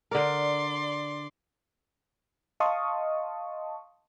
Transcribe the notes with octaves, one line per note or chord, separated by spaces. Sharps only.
D3 A#4 D5 C6
D#5 F5 A5 C6 C#6 D#6